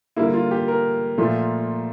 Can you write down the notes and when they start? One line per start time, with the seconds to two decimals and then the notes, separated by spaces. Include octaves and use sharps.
0.16 D3 G3 A#3 E4
0.34 F4
0.51 G4
0.68 A#4
1.18 A#2 F3 A3